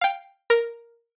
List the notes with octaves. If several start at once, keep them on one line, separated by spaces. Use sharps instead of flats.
F5 G5
A#4 A#5